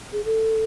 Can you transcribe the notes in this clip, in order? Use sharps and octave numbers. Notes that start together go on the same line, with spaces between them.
G#4
A4